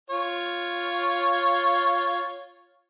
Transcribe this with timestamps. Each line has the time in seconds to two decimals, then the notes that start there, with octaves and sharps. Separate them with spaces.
0.10 F4 C#5